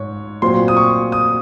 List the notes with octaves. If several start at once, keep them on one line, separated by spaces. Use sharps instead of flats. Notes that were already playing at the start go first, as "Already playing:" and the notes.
Already playing: G#2 C#5
A#2 F#3 C4 C6
D#6
C#6
D#6